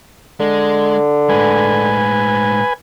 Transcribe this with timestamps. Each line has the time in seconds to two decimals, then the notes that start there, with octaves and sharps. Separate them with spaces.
0.40 D3 G#3
1.29 A2 G#3 B4 G#5